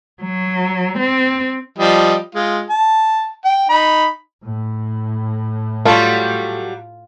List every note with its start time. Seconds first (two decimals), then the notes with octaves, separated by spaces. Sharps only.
0.23 F#3
0.99 C4
1.78 F3 G3 D#5
2.35 G#3 F4
2.70 A5
3.45 G5
3.69 D#4 B5
4.44 A2
5.85 F#3 G3 A3 F4